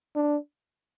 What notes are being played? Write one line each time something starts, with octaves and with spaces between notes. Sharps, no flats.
D4